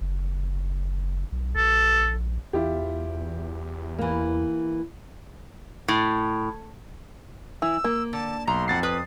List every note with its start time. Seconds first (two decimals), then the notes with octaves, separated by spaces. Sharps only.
0.01 F#1
1.32 B1
1.56 A#1 A4
2.53 E2 E4 F4 G4
3.99 E3 A#3
5.88 A2
7.62 E3 E6
7.84 A#3
8.13 D3 A5
8.47 B1 A#5 C6
8.68 F2 F#5 A6 C7
8.83 B4 D#6